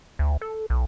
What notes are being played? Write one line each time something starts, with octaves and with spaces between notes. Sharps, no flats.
D2
A4
B1